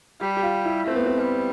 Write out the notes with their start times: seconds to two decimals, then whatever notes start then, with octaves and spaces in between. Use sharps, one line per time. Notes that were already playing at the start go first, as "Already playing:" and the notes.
0.20 G3 G4
0.37 G4
0.42 F4
0.65 E4
0.86 A3 C4
0.96 B3
1.06 C4
1.19 G3